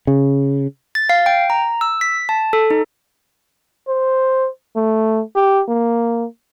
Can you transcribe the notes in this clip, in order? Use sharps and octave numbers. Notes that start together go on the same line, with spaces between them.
C#3
A6
F5
G5
A#5
E6
B6
A5
A4
D#4
C5
A3
G4
A#3